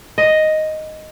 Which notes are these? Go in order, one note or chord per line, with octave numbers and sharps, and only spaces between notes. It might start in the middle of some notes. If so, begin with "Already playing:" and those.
D#5